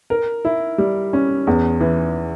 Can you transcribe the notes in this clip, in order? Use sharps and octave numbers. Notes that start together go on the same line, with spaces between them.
A#4
E4
G3
C#4
E2
E3